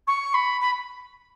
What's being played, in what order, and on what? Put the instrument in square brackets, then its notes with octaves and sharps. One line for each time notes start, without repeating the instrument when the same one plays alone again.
[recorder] C#6
B5
B5